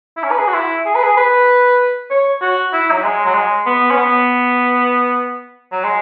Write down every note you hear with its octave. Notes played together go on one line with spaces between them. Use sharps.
E4
C#4
B4
G#4
F#4
E4
G#4
B4
G#4
B4
C#5
F#4
E4
F#3
G#3
F#3
G#3
B3
C#4
B3
F#3
G#3